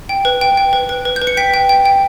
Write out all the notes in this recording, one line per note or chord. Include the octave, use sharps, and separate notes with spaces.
G5
B4
G5
G5
B4
B4
B4
G6
B4
C#7
G5 B6
G5
G5
G5